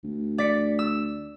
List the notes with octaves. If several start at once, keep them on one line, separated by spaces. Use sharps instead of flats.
D2
D5 B6 C#7
E6